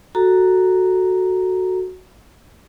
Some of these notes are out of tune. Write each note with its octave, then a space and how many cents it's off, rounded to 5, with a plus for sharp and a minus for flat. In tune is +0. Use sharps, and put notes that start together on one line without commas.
F#4 +0 A4 +0 A#5 +0